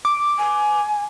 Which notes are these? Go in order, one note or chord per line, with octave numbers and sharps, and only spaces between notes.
D6
G#5